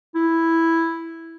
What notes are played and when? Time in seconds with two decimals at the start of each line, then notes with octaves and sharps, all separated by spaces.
0.15 E4